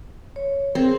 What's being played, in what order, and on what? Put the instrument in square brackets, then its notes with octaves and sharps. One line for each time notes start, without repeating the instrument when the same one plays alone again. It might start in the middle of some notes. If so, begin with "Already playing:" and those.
[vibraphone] C#5
[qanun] C4 [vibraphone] G#4 A#4 C5